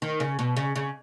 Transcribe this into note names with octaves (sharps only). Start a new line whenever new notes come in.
D#3
C#3
B2
C#3
C#3